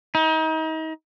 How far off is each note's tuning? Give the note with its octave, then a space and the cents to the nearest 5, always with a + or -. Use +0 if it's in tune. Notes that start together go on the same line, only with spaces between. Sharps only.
D#4 +35